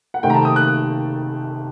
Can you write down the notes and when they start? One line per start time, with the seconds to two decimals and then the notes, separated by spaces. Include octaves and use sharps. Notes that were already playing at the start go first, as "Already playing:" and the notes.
0.14 F#5
0.23 C3 D#3 A3 C4 G5
0.30 A#5
0.34 A5
0.45 D#6
0.56 F#6